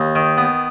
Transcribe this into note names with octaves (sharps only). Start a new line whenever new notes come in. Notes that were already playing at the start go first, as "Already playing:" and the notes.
Already playing: D#2
D#3
B3